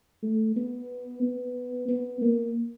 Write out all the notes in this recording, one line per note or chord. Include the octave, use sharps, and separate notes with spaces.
A3
B3
B3
B3
A#3